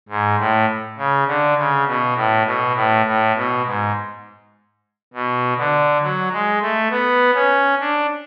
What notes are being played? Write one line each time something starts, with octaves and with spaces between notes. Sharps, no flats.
G#2
A2
C#3
D3
C#3
B2
A2
B2
A2
A2
B2
G#2
B2
D3
F#3
G#3
A3
B3
C#4
D4